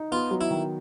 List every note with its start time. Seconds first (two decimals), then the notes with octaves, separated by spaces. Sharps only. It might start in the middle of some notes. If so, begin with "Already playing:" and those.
Already playing: D#4
0.11 B3 F4
0.31 F#3
0.41 E4
0.51 D#3